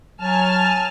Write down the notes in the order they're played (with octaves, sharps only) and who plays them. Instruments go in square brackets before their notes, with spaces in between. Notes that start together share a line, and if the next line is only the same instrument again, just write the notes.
[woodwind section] F#3 [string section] G#5 A5 F6